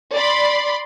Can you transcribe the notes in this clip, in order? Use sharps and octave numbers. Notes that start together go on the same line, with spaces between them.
D5 B5 C6